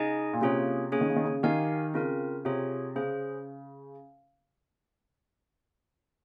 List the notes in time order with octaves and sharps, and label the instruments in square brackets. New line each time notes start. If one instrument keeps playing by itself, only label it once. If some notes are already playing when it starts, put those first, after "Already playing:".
Already playing: [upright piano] C#3 [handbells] D#4 G#4 D#5 G#5
[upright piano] A#2
[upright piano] C3 [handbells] A#3 C#4 F4 G#4 C#5
[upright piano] C#3 [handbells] A#3 C#4 G#4 C#5 G#5
[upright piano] D#3
C#3
D#3
C#3
[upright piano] D#3 [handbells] G4 A#4 F5 G#5
[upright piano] C#3 [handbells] C4 F4 A#4
[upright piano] C3 [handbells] F4 G#4 C#5
[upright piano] C#3 [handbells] C#4 G#4 C5